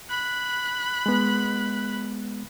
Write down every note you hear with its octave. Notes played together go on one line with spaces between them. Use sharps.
B5 F#6
G#3 B3